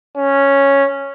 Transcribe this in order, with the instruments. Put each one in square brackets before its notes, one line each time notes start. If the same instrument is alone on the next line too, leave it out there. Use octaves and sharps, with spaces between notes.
[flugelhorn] C#4